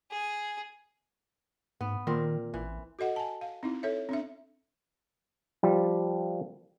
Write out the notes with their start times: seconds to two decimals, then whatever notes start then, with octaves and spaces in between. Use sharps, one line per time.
0.11 G#4
1.81 G#2 B3
2.07 A#2 D#3 C4 A#4
2.54 A1 E3
2.99 F#4 A4 D#5 F#5
3.16 G#5 A5
3.41 F5
3.63 C4 D#4 E4
3.83 A4 C#5 E5
4.09 C4 D4 E5
5.63 F3 G3